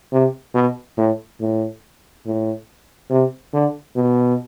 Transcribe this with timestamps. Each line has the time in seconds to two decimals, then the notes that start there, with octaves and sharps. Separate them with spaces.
0.12 C3
0.54 B2
0.98 A2
1.41 A2
2.26 A2
3.10 C3
3.54 D3
3.96 B2